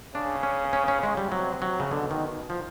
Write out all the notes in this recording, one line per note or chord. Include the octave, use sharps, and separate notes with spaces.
C#3 D4
C#4
C#4
C#4
G#3
G3
C3 F#3
F#3
C#3
B2 D3
D#3
F3